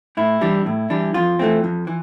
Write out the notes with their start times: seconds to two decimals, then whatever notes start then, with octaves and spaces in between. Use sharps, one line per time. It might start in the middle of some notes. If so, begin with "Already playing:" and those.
0.17 A2 E4
0.41 E3 G3 D4
0.66 A2
0.90 E3 G3 D4
1.14 F2 F4
1.39 E3 A3 C4
1.64 F2
1.87 E3